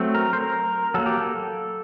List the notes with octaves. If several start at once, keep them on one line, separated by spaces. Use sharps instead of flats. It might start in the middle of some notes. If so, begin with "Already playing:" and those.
Already playing: F#3 A3 C4
A#4
C5
A#4
F#3 A#3 A4
G4
A4